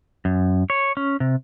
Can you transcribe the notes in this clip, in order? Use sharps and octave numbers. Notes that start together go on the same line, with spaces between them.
F#2
C#5
C#4
C3